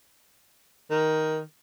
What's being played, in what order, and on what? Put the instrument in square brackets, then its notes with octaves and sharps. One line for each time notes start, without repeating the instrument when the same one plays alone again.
[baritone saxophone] D#3